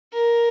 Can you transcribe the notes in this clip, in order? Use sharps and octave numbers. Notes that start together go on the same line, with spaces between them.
A#4